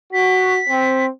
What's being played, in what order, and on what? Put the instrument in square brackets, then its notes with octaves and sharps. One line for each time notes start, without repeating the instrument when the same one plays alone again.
[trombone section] F#4 [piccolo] B6
[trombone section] C4